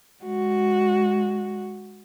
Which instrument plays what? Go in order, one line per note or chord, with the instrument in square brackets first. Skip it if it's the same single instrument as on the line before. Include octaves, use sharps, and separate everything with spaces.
[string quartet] G#3 F#4